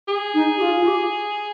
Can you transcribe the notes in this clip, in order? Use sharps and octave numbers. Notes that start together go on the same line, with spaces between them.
G#4
D#4
G4
F4
F4
G4